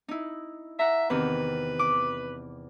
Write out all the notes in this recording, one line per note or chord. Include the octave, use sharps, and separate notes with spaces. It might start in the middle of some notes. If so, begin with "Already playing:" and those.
D#4 E4
E5 F#5 A#5
E2 C3 D#3 B4
D6